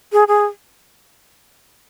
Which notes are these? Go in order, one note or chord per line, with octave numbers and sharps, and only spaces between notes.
G#4
G#4